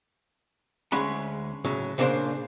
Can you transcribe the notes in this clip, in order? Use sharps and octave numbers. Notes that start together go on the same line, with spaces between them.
D2 G#3 C#4 F#5 B5
A2 C#3 F#3
A#2 C#3 A#3 D4 C5 F5